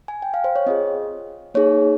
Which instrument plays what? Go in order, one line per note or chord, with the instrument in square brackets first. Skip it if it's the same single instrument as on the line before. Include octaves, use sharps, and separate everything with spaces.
[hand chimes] G#5
G5
F5
C5
C#5
C4 F4 G#4 D#5
A#3 D#4 G#4 C#5